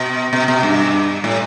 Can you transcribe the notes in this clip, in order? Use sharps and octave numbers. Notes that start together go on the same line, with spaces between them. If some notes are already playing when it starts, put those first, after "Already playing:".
Already playing: B2
B2
B2
G2
A2